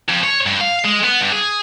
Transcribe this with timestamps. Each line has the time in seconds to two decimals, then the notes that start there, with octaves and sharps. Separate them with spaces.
0.09 F2
0.24 C#5
0.46 G2
0.61 F5
0.84 G#3
1.03 B3
1.20 G2
1.32 G#4